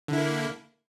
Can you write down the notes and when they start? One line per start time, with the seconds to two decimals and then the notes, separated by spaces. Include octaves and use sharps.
0.08 D3
0.13 E4
0.18 A#3